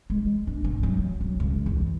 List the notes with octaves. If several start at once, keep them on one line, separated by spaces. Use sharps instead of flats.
G#3
D4
G2
F#3
F#3
C#2
E2